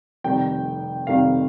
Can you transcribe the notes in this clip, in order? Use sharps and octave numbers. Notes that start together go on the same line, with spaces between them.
F1 F2 D#3 G3 G5
F1 F2 D#3 G3 F5